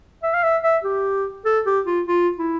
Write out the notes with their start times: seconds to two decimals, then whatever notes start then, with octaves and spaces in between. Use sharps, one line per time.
0.23 E5
0.34 F5
0.43 E5
0.63 E5
0.84 G4
1.45 A4
1.66 G4
1.86 F4
2.07 F4
2.38 E4